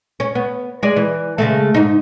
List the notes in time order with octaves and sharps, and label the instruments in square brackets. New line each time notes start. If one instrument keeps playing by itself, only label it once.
[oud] C#4
B3
G#3 D5
E3
C#3 G#3 A3
G#2 D#4